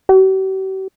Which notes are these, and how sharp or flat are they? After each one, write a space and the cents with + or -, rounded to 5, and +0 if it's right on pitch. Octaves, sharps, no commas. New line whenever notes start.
G4 -45